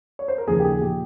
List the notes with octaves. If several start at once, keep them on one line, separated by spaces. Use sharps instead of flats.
C#5
C5
A#4
D#2 C#3 F3 G#4
G4
G#4
A#2 F3 G4